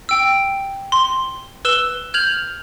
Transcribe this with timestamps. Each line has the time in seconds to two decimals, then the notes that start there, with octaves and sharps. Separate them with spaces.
0.09 G5 E6
0.92 C6
1.65 B4 E6 E7 G7
2.14 F6 G6 G#6 F7 F#7